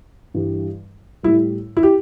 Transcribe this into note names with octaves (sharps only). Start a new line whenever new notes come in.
G2 E3 G3
A2 G3 E4
E4
G4